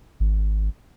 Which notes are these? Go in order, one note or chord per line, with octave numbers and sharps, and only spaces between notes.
G#1